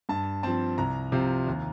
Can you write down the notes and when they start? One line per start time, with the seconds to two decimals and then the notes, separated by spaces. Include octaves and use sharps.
0.09 G2 A5
0.43 F3 C4 A5
0.78 C2 A#5
1.12 C3 F3 C4 F4
1.47 D#2